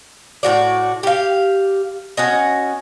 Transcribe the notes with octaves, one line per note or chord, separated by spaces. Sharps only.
A2 F#4 D5
G4 F5
C#4 F#4 D#5